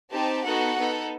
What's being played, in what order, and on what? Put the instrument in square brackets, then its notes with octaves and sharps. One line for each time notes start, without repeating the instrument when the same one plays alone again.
[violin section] C4 D#4 G4 A5
B3 D#4 F#4 A4 F#5
B3 D#4 A4